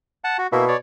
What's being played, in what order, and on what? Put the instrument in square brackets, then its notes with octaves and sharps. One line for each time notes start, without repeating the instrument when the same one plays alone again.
[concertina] F#5 A5
F#4
[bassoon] B2 [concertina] A#3 E4
[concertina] C#5 D5